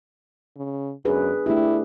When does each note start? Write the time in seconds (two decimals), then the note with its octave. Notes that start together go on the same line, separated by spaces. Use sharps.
0.57 C#3
1.05 F#2 D4 G#4 B4
1.46 A3 D4 E4 G4